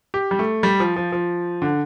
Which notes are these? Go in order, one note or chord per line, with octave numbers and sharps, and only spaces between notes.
G4
G3
A3
G3
F3
F3
F3
D3